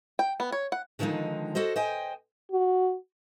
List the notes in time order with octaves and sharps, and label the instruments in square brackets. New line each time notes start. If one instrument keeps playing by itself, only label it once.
[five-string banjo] G5
B3
C#5
F#5
[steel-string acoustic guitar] D3 D#3 F3 G#3 D#4
F#4 A4 C5 D#5
C5 D#5 G5 G#5
[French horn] F#4